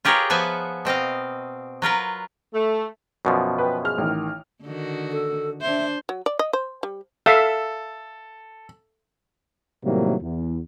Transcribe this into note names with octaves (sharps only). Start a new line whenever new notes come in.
F4 G4 G#4 A#4 B4 C#5
F3 B3 B4 E5 G#5
B2 C4 D#5 F5
F#3 F4 A#4 B4
A3
F#2 B2 F3
B4 G5
G#4 F6
A1 D#3
D3 D#3 F#4
A4
D4 C5 E5
F#3
D5
D#5
C5
G3
A4 E5 F5
A2 C3 D#3 F#3 G3 A#3
E2